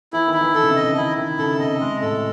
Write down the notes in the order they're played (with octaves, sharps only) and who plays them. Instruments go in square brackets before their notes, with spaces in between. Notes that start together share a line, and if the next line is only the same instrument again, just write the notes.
[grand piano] E3 [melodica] E4
[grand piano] D#3
[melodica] E4
[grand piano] E3
[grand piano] E3 [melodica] A4
[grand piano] C#3
C3
[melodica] D#5
[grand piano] C#3
[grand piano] D#3 [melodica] E4
[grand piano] D#3 [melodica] E4
[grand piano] C#3 [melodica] A4
[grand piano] C3 [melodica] D#5
[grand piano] C3 [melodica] G#3
[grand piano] A2 [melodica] A4